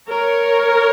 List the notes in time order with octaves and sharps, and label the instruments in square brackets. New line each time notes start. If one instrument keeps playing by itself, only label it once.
[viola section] A#4 C#5